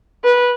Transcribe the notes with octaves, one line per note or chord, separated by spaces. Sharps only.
B4